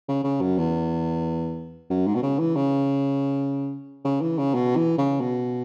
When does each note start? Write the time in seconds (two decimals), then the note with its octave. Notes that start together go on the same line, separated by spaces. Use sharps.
0.08 C#3
0.24 C#3
0.41 F#2
0.58 E2
1.90 F#2
2.07 G#2
2.15 B2
2.22 C#3
2.39 E3
2.56 C#3
4.04 C#3
4.21 E3
4.38 C#3
4.54 B2
4.76 E3
4.98 C#3
5.20 B2